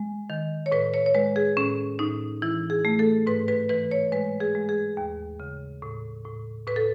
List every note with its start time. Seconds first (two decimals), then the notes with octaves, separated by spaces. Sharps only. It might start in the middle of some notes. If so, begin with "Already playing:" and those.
Already playing: G#3
0.30 D#3
0.66 C#5
0.72 A2 B4
0.94 C#5
1.06 C#5
1.15 G#3 B4
1.36 G#4
1.57 A2 C#4
1.99 A2 D#4
2.42 E3 E4
2.70 G#4
2.85 A3
2.99 A4
3.27 G#2 B4
3.48 B4
3.69 E3 B4
3.91 C#5
4.12 G#3 B4
4.40 G#4
4.55 G#3
4.69 G#4
4.97 D#2
5.40 C#3
5.82 A2
6.25 A2
6.67 A2 B4
6.76 A4